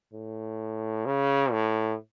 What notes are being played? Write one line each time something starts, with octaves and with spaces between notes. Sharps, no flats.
A2
C#3
A2